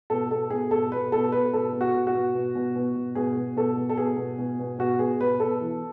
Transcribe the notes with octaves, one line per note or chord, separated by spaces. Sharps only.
B2 A4
B2 A4
B2 G#4
B2 A4
B2 B4
B2 A4
B2 B4
B2 A4
B2
F#4
B2
F#4
B2
B2
B2
B2
B2
B2 G#4
B2
B2 A4
B2
A4
B2 G#4
B2
B2
B2
B2 F#4
B2 G#4
B2 B4
B2 A4
E3